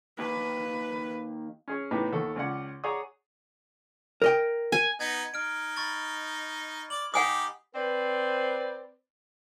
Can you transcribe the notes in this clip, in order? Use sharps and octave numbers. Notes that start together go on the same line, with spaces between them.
D#2 B4
C#4 G#4 C#5
A2 B3 D#4 G4 B4
D#2 A4 F#5 C#6
C#2 C#4 D5 F#5
G#4 C#5 D5 F#5 A#5 D#6
A#4 D#5 G5
G#5
B3 D#4 G#6
D#4 F6 D7
B5 C#6 A6
D5 F#7
D#4 G4 F#5 G#5 D#6
C4 B4 C5 D5